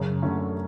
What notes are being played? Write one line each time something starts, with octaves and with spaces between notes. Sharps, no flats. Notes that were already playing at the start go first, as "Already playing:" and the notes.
Already playing: F#2 C#3
D3 A3 C#4